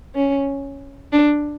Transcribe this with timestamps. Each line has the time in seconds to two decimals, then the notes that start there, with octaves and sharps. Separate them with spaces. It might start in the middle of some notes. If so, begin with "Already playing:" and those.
0.15 C#4
1.12 D4